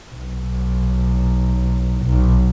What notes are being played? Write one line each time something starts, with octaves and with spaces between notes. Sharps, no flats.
B1
B1